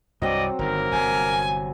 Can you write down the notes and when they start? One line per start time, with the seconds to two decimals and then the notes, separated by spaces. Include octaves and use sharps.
0.22 C2 G2 F#3 C4 D5 D#5
0.59 G1 G2 D#3 A#3 A#4
0.92 G1 C3 G#5